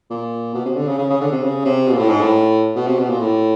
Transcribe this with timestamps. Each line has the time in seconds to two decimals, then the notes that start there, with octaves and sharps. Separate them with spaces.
0.10 A#2
0.54 B2
0.65 C3
0.76 D3
0.87 C#3
0.98 C#3
1.09 C#3
1.21 D3
1.32 C3
1.43 C#3
1.65 C3
1.87 B2
1.93 A#2
1.98 A2
2.09 G#2
2.20 A2
2.75 B2
2.87 C3
2.98 B2
3.09 A#2
3.20 A2